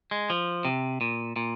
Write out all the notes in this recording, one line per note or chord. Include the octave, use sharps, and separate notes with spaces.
G#3
F3
C3
A#2
A#2